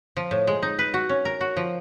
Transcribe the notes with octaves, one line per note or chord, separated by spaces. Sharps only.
F3
A2
G#3
D#4
B4
F#4
C#4
A#4
F#4
F3